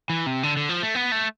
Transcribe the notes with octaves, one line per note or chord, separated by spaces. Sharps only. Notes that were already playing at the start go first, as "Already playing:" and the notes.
E3
C3
D3
D3
F3
A3
B3
A3